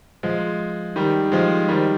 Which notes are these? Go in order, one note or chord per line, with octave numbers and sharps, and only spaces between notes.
F3 G#3
D#3 G3
F3 G#3
D#3 G3